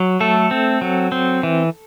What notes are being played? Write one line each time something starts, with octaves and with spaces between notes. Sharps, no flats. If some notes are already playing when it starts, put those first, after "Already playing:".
Already playing: F#3
A3 A4
C4
F#3
C4
E3